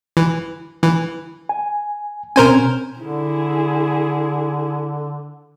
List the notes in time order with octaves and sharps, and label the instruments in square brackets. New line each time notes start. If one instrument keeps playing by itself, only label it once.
[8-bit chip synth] E3
E3
[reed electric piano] G#5
[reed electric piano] B2 C4 C#4 [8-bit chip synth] A#4 C5 G#5
[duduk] D3 [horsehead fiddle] E4 G#4